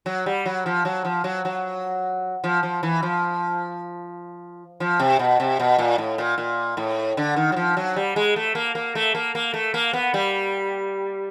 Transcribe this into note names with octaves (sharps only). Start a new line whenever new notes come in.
F#3
G3
F#3
F3
F#3
F3
F#3
F#3
F3
F3
E3
F3
F3
C3
B2
C3
B2
A#2
A2
A#2
A#2
A2
D3
D#3
F#3
F3
F#3
G3
G#3
A3
A#3
A#3
A3
A#3
A#3
A3
A#3
B3
G3